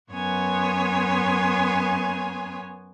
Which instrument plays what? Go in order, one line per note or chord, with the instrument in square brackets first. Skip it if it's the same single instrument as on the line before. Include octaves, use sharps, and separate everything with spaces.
[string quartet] F#2 B3 C#5 G#5 C6